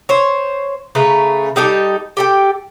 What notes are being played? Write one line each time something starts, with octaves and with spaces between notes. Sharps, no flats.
C5 C#5
C#3 A3 B4 A#5
G3 D#4 G4 A4
G4 A4 G5